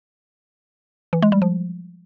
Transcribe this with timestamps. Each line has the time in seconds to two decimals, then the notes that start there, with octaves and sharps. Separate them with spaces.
1.13 E3
1.22 G#3
1.32 G3
1.42 F3